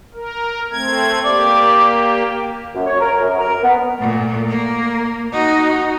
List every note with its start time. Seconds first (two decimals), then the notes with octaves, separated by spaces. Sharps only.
0.14 A#4
0.72 A3 C4 G#6
1.25 A#3 G4 D5
2.75 F#2
2.86 C#5
3.00 A#4
3.20 F#2
3.38 A#4
3.64 B3
4.00 A#2 A3
4.49 A#3
5.33 D#4 F#4